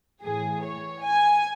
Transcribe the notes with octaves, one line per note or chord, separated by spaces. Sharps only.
A2 E3 G#4
C#5
G#5